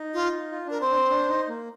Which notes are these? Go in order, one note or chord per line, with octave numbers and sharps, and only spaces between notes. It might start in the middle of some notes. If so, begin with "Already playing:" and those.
Already playing: D#4
F4
F4
D4 A#4
C4 C5
D4
C4
D4
D#4
A#3